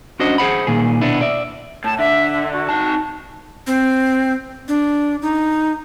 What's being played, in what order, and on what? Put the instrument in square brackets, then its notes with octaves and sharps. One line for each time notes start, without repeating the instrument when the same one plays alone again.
[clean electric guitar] C#4 D4 F#4 C5 D#5
G#4 C5 F#5 B5
A#2 D#3 G#4
B2 B3 D4 E4
D5 E5
[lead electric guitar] A2 [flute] A5
[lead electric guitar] D3 [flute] E5
[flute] F#4
[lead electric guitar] D#4 A5
[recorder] C4
D4
D#4